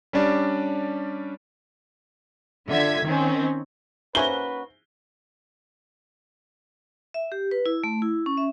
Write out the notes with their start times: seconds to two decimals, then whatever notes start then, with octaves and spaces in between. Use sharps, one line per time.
0.13 G3 C#4 D4 D5
2.68 D3 F4 E5 G#6 B6
3.05 D#3 C4 C#4
4.15 A#3 C#4 F#4 B4 C5 E5 G#5 G7
7.14 E5
7.32 G4
7.51 B4
7.66 E4
7.84 A3
8.02 E4
8.26 C#4
8.37 E5